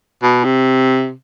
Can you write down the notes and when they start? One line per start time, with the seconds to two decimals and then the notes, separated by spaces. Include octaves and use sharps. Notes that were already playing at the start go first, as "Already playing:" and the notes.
0.23 B2
0.44 C3